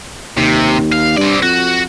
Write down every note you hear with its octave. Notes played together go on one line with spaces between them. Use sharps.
D#2 C3
F5
G2 C4 D5
F2 F#4